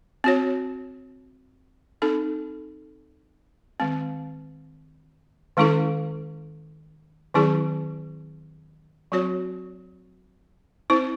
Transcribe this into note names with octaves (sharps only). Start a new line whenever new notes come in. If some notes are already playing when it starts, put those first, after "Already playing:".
C4 F#4 C#5
C4 D#4 A4
D#3 G#3 C4
D#3 G#3 C#4 E4 A4
D#3 F#3 C4 E4 G#4
F#3 C4 F#4 C#5
C4 E4 C5